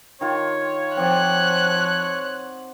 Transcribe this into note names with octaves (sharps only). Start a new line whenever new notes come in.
D#3 F4 C#5
F3 C4 D5 F#5 F#6